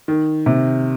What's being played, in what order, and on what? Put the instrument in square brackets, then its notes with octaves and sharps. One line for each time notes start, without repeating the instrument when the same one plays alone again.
[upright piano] D#3
C3